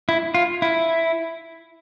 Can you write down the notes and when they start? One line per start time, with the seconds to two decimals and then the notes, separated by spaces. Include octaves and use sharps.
0.09 E4
0.34 F4
0.62 E4